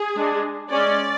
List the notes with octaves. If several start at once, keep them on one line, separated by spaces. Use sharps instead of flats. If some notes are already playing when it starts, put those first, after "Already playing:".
Already playing: G#4
G#3 D4
G#3 C#4 D5